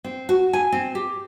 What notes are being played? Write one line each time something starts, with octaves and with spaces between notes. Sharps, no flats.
C4
F#4
G#5
C4
G4